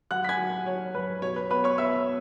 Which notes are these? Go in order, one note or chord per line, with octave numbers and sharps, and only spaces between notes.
F#3 F#5 F#6
B6
G#5 G#6
F#3
F#3 C#5
F#2 B4
B2 C#5
B4
B3 B4 B5
C#5 C#6
B3 E5 E6